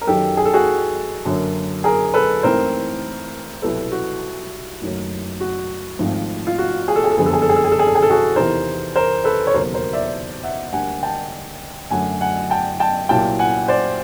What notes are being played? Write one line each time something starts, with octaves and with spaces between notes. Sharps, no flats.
A#4
F#2 D#3 F#3 G4 A4
G#4
A4
F#4 G#4
F#2 D3 F#3 A#3
G#4 A#4
A4 B4
A1 G#2 E3 A3 C4 A#4 C5
C2 B2 F#3 A4 B4
F#4
F#1 F#2 D#3 F#3 A3
F#4
G#1 G#2 F3 A3 C4
F4
F#4
G#4
A4
G#4
A4
F#1 F2 D3 G3 B3 G#4
A4
G#4
A4
G#4
A4
G#4
A4
G#4
A4
G#4
A4
F#4 G#4
E2 C3 D#3 A#4 C5
A#4 C5
A4 B4
C#5
E1 D#2 C#3 F#3 A#4 C5
A#4 C5
D5 E5
E5 F#5
D2 D3 G3 A#3 F#5 G#5
G5 A5
F#2 D3 F#3 A3 F#5 G#5
F#5 G#5
G5 A5
G5 A5
C2 A#2 F#3 G5 A5
F#5 G#5
C5 D5